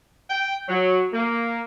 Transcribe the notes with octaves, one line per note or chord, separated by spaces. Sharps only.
G5
F#3
A#3